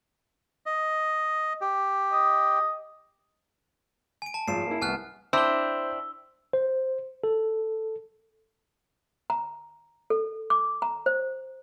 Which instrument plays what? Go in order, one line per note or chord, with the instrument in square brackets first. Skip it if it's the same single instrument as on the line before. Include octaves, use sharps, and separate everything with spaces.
[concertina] D#5
G4
[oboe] D#5
[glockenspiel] G#5 D7
A5
[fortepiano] G#1 F3 [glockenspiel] C7 E7
[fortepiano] A#3 E4
[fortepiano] C2 B3 [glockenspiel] G#5 F6 F#6
[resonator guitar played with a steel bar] C4 D4 E4 [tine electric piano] C5 [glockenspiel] E6 G7
[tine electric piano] C5
A4
[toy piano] A#5
A4
D6
A#5
C5